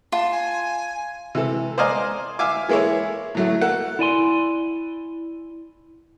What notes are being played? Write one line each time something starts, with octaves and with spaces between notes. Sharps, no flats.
F4 A5
G#5
C3 E3 A4
C5 D5 D#5 F5 G#5 A#5
E5 F5 G#5 D6
E3 G#3 A#3 E4 A4 C#5
A2 F#3 A3
A#3 A4 F#5
E4 D5 G#5 C6